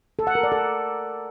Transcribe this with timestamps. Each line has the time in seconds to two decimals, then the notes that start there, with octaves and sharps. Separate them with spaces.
0.19 A4
0.27 F#5
0.35 A#4
0.43 D5
0.52 A4